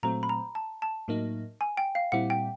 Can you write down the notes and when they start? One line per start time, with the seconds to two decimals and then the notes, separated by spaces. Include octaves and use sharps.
0.03 A#2 F#3 A3 C4 A#5
0.23 B5
0.29 A#5
0.55 A5
0.82 A5
1.08 A2 F#3 A#3 D#4
1.61 G#5
1.77 G5
1.95 F5
2.12 A#2 G3 C4 E4 F#5
2.30 G5